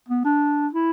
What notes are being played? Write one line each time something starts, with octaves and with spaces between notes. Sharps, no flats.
B3
D4
E4